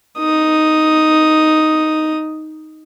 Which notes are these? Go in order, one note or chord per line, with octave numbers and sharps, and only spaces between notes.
D#4 D#6